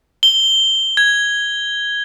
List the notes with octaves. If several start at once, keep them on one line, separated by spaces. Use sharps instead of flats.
G7
G#6